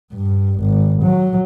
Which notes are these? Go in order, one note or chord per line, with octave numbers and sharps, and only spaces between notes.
G2
G#1
F#3